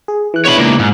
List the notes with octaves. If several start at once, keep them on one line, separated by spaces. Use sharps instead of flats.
G#4
E3 F#6
B3 D4 E4 C#5 B5
C#2 A#3
G#2